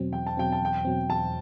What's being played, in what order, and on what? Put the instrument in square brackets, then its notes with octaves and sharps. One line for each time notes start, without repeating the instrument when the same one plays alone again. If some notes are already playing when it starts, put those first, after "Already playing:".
Already playing: [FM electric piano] E2 B2 F#3 C4
[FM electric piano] E2 [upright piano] G5
[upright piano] A5
[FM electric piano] B2 F#3 C4 [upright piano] G5
[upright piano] A5
[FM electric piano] E2 [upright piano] G5
[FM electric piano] B2 F#3 C4
[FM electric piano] E2 [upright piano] A5